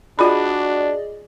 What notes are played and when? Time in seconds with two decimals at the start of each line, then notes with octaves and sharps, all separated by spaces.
0.19 D4 F4 F#4 G#4 D5 D#5 B5